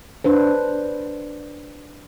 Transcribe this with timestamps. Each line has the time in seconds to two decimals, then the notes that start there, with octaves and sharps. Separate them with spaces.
0.24 D4 B4 C5